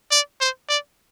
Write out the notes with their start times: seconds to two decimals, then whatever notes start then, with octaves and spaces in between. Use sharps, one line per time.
0.11 D5
0.41 C5
0.69 D5